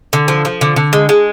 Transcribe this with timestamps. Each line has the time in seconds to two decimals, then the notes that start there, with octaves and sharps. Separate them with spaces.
0.13 D3
0.28 F3
0.45 F3
0.61 D3
0.76 D3
0.93 G#3
1.09 G#3